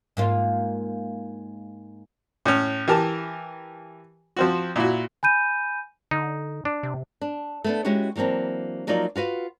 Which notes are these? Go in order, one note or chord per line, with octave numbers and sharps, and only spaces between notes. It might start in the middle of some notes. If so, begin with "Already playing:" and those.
G#2 A#3 F4
A2 C#4
E3 G4 A#4 A5
F3 C4 F#4
A#2 E4 F#4
G#5 B5 G6 D#7
D3 D#4
D4
C3
D4
A3 B3 D4
G#3 C#4 E4 F#4 G4 C#5
E3 F#3 A#3 C4 D4
F3 F#3 A#3 D#4 F4 D5
F4 F#4 B4 F5